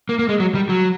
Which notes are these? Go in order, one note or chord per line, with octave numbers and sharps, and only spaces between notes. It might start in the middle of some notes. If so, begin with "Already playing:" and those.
A#3
A#3
G#3
F#3
G3
F#3